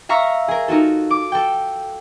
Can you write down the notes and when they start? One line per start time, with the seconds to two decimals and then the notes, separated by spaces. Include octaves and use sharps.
0.09 E5 F5 A#5 C#6 A#6
0.48 G#4 A#4
0.68 D#4 F4 F#4 A4
1.11 D6
1.32 A4 G5